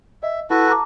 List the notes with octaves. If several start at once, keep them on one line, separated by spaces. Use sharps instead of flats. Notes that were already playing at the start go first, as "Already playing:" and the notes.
D#5 E5
E4 F#4 A4 B4
A5 A#5 D6